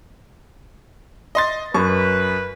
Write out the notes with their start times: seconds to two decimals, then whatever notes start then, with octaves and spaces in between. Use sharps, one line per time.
1.35 D#5 C6 A6
1.74 F#2 B4 C#6